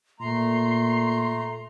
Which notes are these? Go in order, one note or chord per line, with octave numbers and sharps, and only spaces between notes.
A#2 A3 A#5 C6